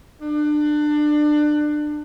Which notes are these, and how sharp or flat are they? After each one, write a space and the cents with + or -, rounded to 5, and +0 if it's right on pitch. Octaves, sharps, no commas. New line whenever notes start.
D4 +25